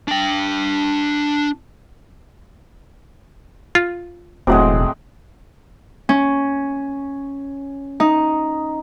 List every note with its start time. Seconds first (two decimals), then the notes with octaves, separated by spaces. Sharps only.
0.09 D4 G5
3.75 F4
4.47 E1 A2 F#3 G#3 C4 F#5 D6
6.09 C#4
8.00 D#4